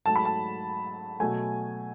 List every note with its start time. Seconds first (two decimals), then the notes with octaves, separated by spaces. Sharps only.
0.06 G#2 F#3 A3 A5
0.16 B5
0.25 A5
1.20 B2 F#3 A3 G#5